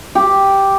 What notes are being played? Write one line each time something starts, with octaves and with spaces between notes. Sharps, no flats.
G4